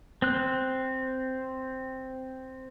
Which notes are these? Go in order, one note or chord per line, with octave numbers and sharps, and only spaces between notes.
C4 F#6